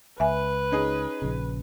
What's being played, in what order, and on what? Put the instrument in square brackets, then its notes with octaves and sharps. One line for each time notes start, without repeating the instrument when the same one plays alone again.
[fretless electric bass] C#2 [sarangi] B4 [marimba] E5 G#5
[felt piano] C#4 D#4 G#4
[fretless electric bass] A#1 C#3